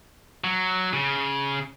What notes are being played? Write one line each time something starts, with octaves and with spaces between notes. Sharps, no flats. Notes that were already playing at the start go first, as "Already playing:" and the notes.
F#3
C#3